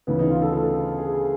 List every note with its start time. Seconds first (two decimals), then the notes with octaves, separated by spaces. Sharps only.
0.07 D2 C#3 E3 B3
0.19 D#4
0.30 F4
0.42 A4
0.54 A4
0.99 G#4